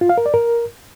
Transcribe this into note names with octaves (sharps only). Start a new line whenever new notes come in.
F4
F5
A#4
D5
A#4